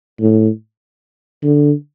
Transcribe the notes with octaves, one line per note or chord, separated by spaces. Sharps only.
A2
D3